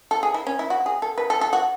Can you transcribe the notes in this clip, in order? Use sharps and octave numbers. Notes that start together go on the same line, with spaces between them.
A4
G#4
E4
C#4
E4
F#4
G#4
A4
B4
A4
A4
F#4